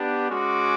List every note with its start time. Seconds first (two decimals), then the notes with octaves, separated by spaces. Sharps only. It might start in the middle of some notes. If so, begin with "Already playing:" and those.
Already playing: B3 D4 G4
0.29 G#3 C#4 F#4 D6